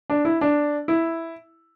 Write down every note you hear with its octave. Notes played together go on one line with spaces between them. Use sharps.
D4
E4
D4
E4